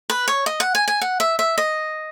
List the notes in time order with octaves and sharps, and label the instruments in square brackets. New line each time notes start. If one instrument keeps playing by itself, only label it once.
[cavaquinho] B4
C#5
D#5
F#5
G#5
G#5
F#5
E5
E5
D#5